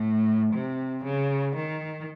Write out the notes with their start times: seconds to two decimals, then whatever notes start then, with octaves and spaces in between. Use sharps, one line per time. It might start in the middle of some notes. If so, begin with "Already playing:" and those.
Already playing: A2
0.52 C3
1.04 C#3
1.56 D#3